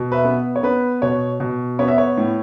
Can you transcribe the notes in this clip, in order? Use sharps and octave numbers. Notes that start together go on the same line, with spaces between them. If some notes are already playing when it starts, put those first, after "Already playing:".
Already playing: B2
B4 E5
B3
C#5
B3 B4
B2 C#5
B2
B3 C#5
E5
C#5
A2